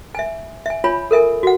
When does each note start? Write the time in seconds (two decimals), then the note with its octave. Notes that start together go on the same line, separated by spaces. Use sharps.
0.15 E5 G#5
0.66 E5 G#5
0.84 F4 C#5 G#5 B5
1.11 A4 A#4 E5 G#5
1.43 F#4 F#5